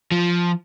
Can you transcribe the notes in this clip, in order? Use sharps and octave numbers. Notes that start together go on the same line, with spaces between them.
F3